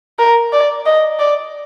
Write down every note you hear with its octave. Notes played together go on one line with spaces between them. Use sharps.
A#4
D5
D#5
D5